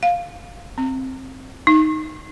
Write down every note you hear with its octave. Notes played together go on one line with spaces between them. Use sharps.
F5
C4
D#4